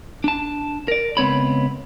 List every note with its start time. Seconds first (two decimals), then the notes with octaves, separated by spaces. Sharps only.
0.24 D4 A5
0.88 A#4 D5
1.17 C#2 B3 C4 C#5 B5